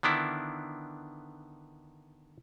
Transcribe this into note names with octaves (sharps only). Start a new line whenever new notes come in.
D3 D#3 B3 D4 E4